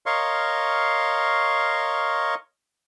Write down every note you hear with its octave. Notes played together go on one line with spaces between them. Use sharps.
A#4 C#5 D#5 F5 C6 C#6